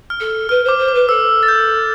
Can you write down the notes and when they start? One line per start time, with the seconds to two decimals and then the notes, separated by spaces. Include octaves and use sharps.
0.10 F6
0.20 A4
0.49 B4 F6
0.64 C5 D6
0.78 C5
0.88 D6
0.94 B4
1.09 A4 E6
1.43 A6
1.48 G6